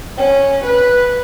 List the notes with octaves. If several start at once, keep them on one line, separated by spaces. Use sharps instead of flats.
C#4
B4